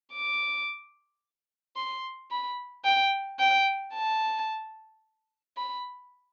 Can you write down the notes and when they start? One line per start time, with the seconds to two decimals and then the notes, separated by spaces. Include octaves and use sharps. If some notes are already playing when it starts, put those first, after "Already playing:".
0.13 D6
1.76 C6
2.31 B5
2.85 G5
3.40 G5
3.95 A5
5.57 B5